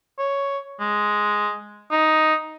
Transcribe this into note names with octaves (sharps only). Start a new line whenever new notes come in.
C#5
G#3
D#4